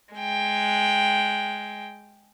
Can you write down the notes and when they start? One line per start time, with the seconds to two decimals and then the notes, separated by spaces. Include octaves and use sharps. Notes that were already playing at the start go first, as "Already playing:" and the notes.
0.15 G#3 G5